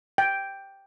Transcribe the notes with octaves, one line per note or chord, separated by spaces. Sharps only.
G5